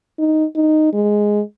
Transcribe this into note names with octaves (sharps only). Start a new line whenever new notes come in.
D#4
D#4
G#3